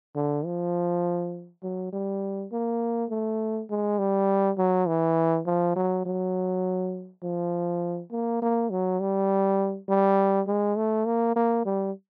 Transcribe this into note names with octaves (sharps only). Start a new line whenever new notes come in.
D3
F3
F#3
G3
A#3
A3
G#3
G3
F#3
E3
F3
F#3
F#3
F3
A#3
A#3
F#3
G3
G3
G#3
A3
A#3
A#3
G3